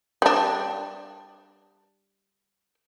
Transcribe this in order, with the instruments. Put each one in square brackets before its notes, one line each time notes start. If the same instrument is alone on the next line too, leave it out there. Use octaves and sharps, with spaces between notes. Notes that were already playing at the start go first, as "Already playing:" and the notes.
[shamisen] G3 D4